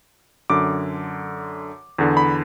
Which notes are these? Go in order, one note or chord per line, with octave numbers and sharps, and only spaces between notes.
F#2 D3 D6
E2 D3
B5